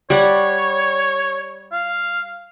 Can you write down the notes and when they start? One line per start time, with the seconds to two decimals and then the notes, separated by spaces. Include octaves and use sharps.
0.10 G3 C#5 F#5
1.72 F5